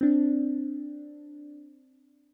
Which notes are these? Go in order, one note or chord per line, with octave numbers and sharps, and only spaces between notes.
C4 D4